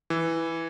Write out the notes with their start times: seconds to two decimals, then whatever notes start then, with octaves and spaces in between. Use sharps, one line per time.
0.10 E3